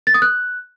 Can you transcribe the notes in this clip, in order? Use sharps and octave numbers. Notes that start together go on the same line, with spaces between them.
A6
D#6
F#6